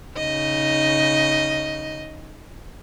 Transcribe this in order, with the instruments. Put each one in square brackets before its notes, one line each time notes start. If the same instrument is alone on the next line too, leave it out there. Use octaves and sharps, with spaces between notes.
[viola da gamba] C#3 D#4 D#5